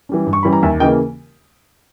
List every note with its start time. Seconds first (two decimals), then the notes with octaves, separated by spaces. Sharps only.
0.09 E3 G3 C#4
0.26 G2
0.33 C#6
0.43 E3 G3 C#4 B5
0.53 A#5
0.63 D#2 E5 G#5
0.80 C#3 E3 A#3 D#5 G5